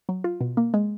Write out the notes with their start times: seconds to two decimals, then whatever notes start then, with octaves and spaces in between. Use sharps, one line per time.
0.09 F#3
0.24 F4
0.41 B2
0.57 A#3
0.74 G#3